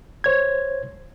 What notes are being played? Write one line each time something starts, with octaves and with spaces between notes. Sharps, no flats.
C5 C#5 G#6